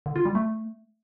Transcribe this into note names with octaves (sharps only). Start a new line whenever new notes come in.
D3
F4
G3
A3